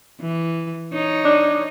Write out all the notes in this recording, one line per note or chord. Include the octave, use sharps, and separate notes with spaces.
E3
D#4 C#5
D4